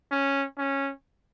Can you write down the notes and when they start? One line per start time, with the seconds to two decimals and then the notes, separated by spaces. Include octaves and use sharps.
0.11 C#4
0.58 C#4